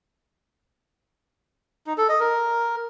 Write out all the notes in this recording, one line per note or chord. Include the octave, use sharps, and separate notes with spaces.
D#4
A4
D#5
A#4